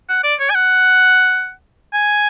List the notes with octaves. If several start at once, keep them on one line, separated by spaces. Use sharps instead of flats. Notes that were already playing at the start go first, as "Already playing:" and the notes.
F#5
D5
C#5
G#5
F#5
G#5